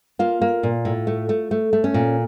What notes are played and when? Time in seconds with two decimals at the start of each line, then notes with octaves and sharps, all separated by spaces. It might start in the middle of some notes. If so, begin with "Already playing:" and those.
0.19 A#3 F4
0.42 A#3
0.63 A#2
0.85 A2
1.07 A3
1.29 A3
1.51 A3
1.73 A3
1.84 C#4
1.94 A#2